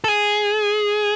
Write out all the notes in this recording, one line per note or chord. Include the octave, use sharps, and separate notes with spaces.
A4
G#4